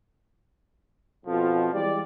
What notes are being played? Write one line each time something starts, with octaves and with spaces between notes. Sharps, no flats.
F2 B2 F3
E3 G3 G#3 G4 D5